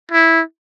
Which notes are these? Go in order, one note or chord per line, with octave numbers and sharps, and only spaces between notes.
E4